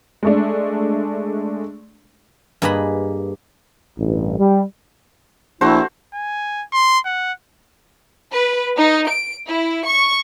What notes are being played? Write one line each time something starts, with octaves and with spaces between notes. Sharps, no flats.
G#3 A3 D4
G2 A#3 G#4 B4 D#5 B5
A1 G2
G3
A#1 A3 E4 F#4 C5
G#5
C6
F#5
B4
D#4
D7
E4
C#6